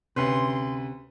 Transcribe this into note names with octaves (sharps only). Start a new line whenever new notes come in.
D2 C3 C#4 B4 C6